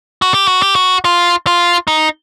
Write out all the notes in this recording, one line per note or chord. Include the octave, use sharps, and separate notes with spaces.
F#4
G4
F#4
G4
F#4
F4
F4
D#4